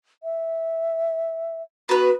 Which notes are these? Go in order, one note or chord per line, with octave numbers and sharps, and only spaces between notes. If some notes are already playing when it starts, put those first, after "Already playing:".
E5
B3 F#4 B4